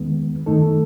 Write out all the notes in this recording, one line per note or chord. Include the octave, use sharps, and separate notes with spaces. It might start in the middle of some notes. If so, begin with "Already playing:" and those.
Already playing: E2 D#3 G#3 B3
F#2 D#3 A3 D#4 A4